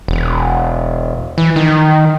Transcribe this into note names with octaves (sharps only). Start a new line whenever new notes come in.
E1
E3
D#3